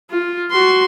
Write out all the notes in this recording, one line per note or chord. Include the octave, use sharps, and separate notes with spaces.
F4
F#4 C6